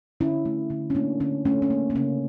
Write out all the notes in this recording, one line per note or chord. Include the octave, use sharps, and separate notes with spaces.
D3 C#4 E4
A3
D3
C#4
A3 A#3 D4
D3 C#4
A3 C#4
C#4
A#3
A#3
C#3 C#4